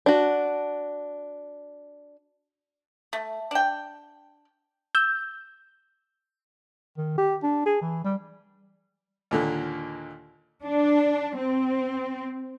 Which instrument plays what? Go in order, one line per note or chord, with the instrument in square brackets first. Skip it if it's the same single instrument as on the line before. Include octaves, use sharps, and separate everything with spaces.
[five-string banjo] D4 F#4
[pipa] A3
D4 G5
[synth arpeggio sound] E6 G6
[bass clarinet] D#3
G4
D4
G#4
E3
G3
[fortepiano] D#2 A#2 D3
[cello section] D4
C4